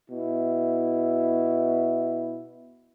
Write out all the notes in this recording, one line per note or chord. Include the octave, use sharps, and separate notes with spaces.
B2 E4